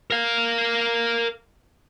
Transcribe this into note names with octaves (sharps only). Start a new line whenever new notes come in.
A#4 F5